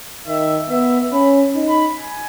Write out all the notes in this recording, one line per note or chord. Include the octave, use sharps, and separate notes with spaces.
D#3 E5
B3 E5
C#4 B5
D#4
B5
G#5